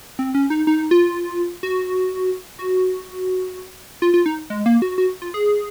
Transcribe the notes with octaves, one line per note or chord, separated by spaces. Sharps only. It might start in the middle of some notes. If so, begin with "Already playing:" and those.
C4
C#4
D#4
D#4
F4
F#4
F#4
F4
F4
D#4
G#3
A#3
F#4
F#4
F4
G#4